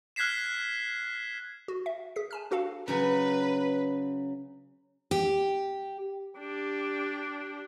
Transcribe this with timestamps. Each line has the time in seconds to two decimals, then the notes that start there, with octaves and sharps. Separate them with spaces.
0.16 F6 F#6 G#6 B6 C7 E7
1.68 F#4
1.86 E5
2.16 G#4 B6
2.31 G#5 A5 F6
2.51 D4 F#4 A4 F5 A5
2.88 C#3 F#3 B4 G#5
5.11 G4
6.39 D4 G4